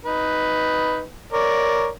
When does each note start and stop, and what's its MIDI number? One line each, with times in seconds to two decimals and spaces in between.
0.05 1.03 63
0.05 1.03 71
1.32 1.89 70
1.32 1.89 73
1.32 1.89 74